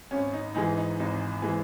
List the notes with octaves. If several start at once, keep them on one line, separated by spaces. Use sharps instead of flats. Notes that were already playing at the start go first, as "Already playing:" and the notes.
G#1 C#4
D#4
G#2 E3 G#3 D#4
D#4
G#1 D#4
E3 G#3